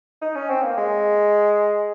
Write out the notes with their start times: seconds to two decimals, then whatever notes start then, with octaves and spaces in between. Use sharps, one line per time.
0.22 D#4
0.36 C#4
0.50 C4
0.63 A#3
0.77 G#3